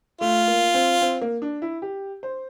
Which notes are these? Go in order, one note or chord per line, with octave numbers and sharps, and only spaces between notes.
A3 F4
A#3
C4
C4
A#3
D4
E4
G4
C5